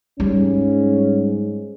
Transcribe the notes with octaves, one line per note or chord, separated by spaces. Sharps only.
G#2 G3 C#4